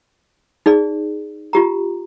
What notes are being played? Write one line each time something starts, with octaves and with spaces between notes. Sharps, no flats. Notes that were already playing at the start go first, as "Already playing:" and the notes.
D#4 G#4 D5
F4 G4 A#5